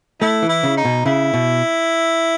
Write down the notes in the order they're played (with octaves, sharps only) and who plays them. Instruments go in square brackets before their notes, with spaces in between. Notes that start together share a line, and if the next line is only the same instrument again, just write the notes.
[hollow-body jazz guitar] A3 [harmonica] E4
[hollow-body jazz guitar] E3
[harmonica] E4
[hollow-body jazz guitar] C#3
[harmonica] D#4
[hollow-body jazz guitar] B2
[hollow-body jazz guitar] C#3 [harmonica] E4
[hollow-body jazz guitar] B2